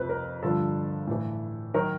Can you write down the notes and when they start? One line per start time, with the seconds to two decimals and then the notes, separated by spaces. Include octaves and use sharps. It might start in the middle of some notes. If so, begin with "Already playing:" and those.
Already playing: F2 C3 F3 B4 C5
0.09 A#4
0.43 G2 D3 F3 A4
1.07 A2 E3
1.74 D#3 F#3 A#4